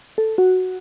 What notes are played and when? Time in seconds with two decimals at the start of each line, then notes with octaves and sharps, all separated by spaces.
0.18 A4
0.38 F#4